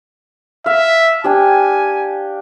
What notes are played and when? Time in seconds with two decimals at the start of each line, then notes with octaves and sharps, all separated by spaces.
0.66 E5 F5
1.24 D4 G4 G#5